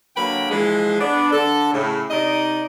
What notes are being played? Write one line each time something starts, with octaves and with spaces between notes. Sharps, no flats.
D3 F#3 A#3 G5 B5
E3 F3 G#3
B3 D4
D3 A4
A2 C#3
C3 D#4 D5 D#5